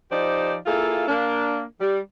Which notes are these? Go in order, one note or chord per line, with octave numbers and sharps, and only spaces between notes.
F3 D#4 G4 C5 D5
A#3 E4 F4 G#4 A4
A#3 D4
G3